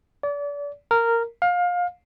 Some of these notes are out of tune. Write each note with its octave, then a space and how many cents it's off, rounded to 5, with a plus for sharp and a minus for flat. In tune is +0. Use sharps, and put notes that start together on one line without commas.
D5 -35
A#4 -10
F5 +25